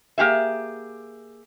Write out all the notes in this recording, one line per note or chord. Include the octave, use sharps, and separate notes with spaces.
A#3 G4 G#4 E5